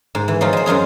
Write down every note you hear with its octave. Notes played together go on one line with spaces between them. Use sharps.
G#2
E3
F3 F#3 D#4 F4
G#3 C5
F#2 F#3 F4 G#4